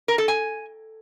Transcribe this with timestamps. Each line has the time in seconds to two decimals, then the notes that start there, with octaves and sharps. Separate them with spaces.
0.08 A#4
0.18 A4
0.28 G#5